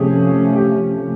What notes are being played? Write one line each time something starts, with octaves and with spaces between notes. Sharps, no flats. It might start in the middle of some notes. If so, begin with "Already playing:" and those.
Already playing: C3 F3 A3 C#4 G4 G#4
G4